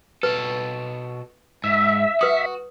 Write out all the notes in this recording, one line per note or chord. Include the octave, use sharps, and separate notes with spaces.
B2 A4 B4
G#2 E5
F#4 B4 D#6